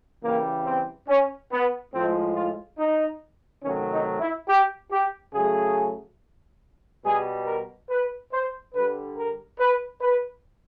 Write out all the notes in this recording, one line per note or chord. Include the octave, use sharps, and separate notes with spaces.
C#3 E3 G3 A#3
C4
C#4
B3
A2 F3 G#3 C4
F4
D#4
C3 D#3 F#3 A3 C#4
D#4
E4
G4
G4
C#3 F#3 A3 G#4
B2 G3 G#4
A#4
B4
C5
D3 G3 B4
A#4
B4
B4